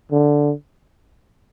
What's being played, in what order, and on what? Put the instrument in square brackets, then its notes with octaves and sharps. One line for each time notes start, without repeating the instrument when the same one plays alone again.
[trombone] D3